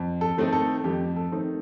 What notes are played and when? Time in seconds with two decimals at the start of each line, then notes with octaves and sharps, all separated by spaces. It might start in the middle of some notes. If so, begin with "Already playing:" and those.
Already playing: F2
0.21 A4
0.37 D#3 A3 C4 D#4
0.53 A4
0.84 F2 G4
1.16 A4
1.32 D#3 A3 C4 D#4